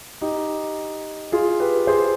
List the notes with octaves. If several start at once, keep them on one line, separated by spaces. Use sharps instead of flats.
D#4 G4
F4 G#4
G4 B4
G#4 C5